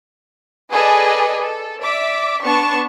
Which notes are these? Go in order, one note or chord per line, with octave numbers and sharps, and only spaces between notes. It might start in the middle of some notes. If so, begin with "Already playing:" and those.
G#4 A4 B4 D5 D#5 G#5
A4
D5 E5 D6 B6
B3 D4 A5 C#6